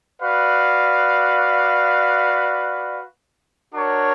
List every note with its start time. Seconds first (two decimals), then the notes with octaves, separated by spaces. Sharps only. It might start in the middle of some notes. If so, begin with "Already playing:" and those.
0.22 F#4 B4 D5 F5
3.73 D4 F#4 A#4 C#5